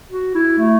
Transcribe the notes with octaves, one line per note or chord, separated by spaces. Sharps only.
F#4
E4
A3